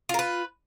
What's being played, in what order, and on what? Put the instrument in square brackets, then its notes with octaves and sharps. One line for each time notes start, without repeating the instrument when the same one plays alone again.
[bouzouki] F4
A#4
B4